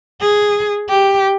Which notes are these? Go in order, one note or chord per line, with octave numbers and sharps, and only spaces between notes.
G#4
G4